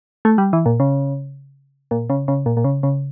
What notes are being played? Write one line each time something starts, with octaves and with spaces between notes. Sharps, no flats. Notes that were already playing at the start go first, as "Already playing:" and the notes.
A3
G3
E3
A#2
C#3
A#2
C#3
C#3
A#2
A#2
C#3
C#3